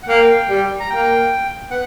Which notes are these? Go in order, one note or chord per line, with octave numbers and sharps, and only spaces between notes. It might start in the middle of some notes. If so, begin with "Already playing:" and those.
F#5
A#3 G5
G3
A#5
A#3 G5
B3 F#5